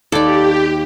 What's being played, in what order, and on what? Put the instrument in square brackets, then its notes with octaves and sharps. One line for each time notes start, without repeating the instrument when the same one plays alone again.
[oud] D#2 [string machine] G4 [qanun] A4 D5